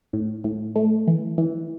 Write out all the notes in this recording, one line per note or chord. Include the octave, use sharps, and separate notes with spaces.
A2
A2
A3
E3
E3